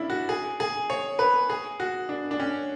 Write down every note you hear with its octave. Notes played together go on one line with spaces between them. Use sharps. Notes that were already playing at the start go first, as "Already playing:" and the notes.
Already playing: C#4 D4 E4
F#4
G#4
G#4
C#5
B4
G#4
F#4
D4
D4
C#4